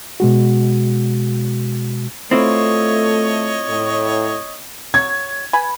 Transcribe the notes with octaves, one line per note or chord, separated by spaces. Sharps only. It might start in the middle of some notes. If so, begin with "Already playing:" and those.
B2 G#3 F#4
A3 C4 E4 F4 C#5 D#5
A2
F#3 C#5 G#6
B4 G#5 B5